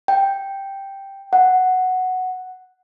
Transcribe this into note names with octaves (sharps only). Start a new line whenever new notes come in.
G5
F#5